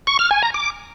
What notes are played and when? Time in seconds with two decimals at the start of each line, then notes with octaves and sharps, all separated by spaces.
0.07 C#6
0.19 F6
0.31 G#5
0.43 A#5
0.54 D6